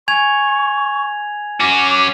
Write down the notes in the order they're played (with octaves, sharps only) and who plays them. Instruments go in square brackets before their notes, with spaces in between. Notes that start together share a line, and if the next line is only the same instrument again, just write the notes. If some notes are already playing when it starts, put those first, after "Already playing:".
[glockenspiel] G#5 G#6 F7 [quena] C#6
[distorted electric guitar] C#4 F#4 [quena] D6